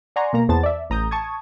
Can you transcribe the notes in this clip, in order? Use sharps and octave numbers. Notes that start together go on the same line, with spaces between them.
D5 F#5 G#5 A#5 C6 C#6
B2 A#3 A#5
E2 B3 C5 A5 A6
D5 E5
A1 A#5 D#6 G6
A5 C#6 D#6 G#6